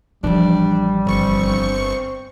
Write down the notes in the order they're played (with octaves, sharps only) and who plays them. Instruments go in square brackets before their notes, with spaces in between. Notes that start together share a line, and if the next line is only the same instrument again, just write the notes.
[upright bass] A1 F3 [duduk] G3 [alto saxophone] D4
[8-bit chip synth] G1 C#6 C#7 [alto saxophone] C4